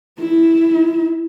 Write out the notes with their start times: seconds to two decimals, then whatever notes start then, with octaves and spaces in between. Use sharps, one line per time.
0.20 E4